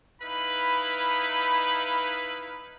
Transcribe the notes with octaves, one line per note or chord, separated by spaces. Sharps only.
D#4 E4 B4 F5 B5